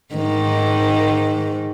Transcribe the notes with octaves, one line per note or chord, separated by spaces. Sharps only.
G#2 D#3